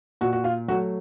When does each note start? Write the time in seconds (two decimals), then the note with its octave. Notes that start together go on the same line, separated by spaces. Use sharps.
0.21 A#2 F#4
0.33 F#4
0.44 F4
0.68 F#3 A3 F#4